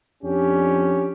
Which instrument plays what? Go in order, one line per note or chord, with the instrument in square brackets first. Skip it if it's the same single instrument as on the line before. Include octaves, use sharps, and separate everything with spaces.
[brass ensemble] F2 D4 G4 [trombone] C#4